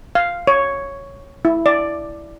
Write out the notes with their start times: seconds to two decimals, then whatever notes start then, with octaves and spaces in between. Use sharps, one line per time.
0.15 F5
0.47 C#5
1.45 E4
1.66 D5